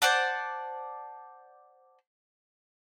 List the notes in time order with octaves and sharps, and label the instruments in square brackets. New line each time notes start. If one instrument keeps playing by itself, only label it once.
[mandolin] C5 D5 F#5 A5